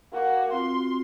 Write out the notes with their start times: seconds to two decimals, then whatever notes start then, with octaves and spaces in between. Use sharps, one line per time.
0.12 A#3 F#4
0.52 C4 F4 F#4 C6